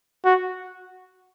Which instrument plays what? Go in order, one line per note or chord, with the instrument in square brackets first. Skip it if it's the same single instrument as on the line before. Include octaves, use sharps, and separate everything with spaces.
[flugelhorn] F#4